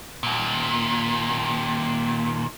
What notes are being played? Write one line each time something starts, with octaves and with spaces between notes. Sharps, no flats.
D#2 A#2